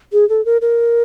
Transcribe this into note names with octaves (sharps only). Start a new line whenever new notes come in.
G#4
A4
A#4
A#4